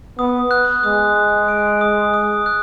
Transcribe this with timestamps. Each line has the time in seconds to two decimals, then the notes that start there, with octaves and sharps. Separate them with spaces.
0.18 B3 D#6
0.51 F#6
0.83 G#3 D#6
1.16 F#6
1.48 D7
1.81 D#6
2.14 D#6
2.46 F#6